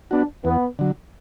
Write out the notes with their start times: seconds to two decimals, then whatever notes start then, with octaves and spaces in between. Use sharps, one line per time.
0.11 B3 D4 F#4
0.45 E2 B3
0.79 D3 F#3